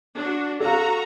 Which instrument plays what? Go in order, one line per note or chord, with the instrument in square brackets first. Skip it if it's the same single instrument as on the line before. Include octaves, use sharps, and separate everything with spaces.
[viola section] D4 F#4
[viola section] F#4 A#5 [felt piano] A4 F5